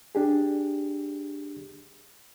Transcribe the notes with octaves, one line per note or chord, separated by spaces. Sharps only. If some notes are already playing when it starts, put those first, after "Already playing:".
D4 G4 G#4